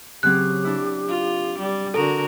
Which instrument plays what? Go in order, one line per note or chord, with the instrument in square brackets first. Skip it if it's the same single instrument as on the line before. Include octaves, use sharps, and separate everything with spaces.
[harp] C#3 F#3 C4 [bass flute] G4 [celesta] F#6
[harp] D4 E4
[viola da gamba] F4
G3
[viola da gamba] D3 F#4 A#4 [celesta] A4